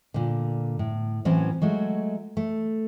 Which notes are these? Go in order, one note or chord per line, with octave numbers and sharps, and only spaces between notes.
A#2 D3
A2
A2 E3 F#3 C4 C#4
F#3 G#3 A3 F#4
A3